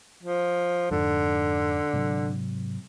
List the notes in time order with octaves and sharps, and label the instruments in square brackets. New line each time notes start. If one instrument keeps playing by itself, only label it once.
[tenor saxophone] F3
[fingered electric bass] F2 G#2 [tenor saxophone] D3
[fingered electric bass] G#2 C3 F#3